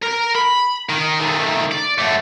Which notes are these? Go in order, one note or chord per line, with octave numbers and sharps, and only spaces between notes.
A#4
B5
D#3 A#4
D#3 A3
D5
F#2 A3